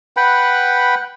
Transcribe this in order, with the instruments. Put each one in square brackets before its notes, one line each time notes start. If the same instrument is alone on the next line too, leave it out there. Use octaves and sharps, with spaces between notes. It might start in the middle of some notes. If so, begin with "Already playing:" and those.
[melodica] B4 F#5 G5 B5